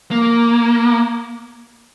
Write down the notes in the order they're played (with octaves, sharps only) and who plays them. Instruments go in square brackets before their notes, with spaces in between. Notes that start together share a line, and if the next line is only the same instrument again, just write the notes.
[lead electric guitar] A#3